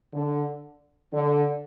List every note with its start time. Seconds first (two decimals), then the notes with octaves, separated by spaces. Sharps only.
0.13 D3
1.12 D3